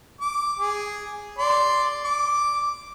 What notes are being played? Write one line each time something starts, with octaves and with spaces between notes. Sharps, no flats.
D6
G#4
D5 C6
D6